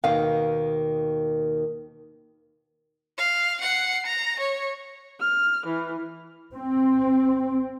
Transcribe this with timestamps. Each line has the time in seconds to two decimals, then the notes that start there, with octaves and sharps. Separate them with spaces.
0.04 D#2 B2 D#3 F5
3.18 F5
3.61 F#5 C7
4.06 A#5
4.40 C#5
5.20 F6
5.65 E3
6.54 C4